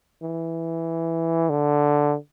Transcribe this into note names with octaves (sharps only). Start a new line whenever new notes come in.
E3
D3